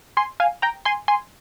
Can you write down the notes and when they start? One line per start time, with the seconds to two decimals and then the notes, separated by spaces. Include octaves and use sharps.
0.17 G#5 C6
0.40 F5 G#5
0.62 G5 A#5
0.85 G#5 C6
1.08 G#5 C6